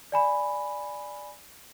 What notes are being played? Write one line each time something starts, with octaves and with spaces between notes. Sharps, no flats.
D5 G#5 B5